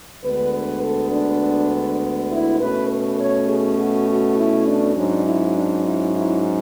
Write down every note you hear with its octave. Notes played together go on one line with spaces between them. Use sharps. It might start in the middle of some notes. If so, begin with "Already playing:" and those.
D2 D3 G#3 B3 B4
B4
A4
D4
E4
B2 A3 C#4 B4
B4
C#5
G#4
F#4
F#4
E4
D4
G#2 F#3 C#4 D4
E4
D4
E4
E4